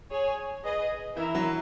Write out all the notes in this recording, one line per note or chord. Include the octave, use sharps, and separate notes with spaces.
G#4 C#5 G#5
G#4 B4 D#5 G#5
E3 E4 A#4 E5
F#3